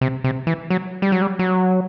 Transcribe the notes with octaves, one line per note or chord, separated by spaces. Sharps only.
C3
C3
E3
F#3
G3
F#3
G3
F#3